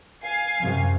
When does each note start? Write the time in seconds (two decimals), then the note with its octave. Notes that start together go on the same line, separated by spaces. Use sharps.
0.23 F5 G#5 C7
0.61 F#2 C3